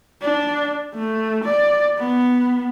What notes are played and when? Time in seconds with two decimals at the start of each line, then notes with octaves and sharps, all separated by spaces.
0.22 D4
0.95 A3
1.44 D5
1.99 B3